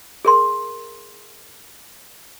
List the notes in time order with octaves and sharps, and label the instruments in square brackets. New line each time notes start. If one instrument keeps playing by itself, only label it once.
[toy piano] G#4 A#4 C6